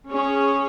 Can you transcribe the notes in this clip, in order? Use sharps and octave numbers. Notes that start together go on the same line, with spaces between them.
C#4 G#4 C#5